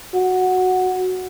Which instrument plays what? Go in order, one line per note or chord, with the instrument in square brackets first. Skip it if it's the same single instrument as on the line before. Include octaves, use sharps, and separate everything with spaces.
[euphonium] F#4